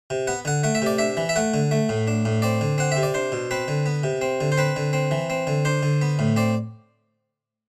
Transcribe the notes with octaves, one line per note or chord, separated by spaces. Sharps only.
C3
B3 F#5
D3 F#5
A3 F#5
E5
C3 D5
D4 E5
E3
E5
A3 F#5
D3
A3
A2
D4
A2
C4 D5
D3
C4 F#5
C3 E5
D5
D4 C5
B2
C4 B4
D3
B3
C3
C4
D3
C5
C4 B4
D3
C4
E3
C4
D3
D4 C5
D3
B3
A2
C4 D5